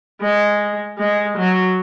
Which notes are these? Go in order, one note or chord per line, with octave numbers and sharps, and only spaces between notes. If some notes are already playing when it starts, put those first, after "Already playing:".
G#3
G#3
F#3